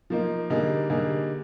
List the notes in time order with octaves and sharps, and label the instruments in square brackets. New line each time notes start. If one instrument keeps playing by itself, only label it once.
[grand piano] F3 A#3 D#4
D3 G3 A#3 D#4 G#4
D3 G3 A#3 D#4 G#4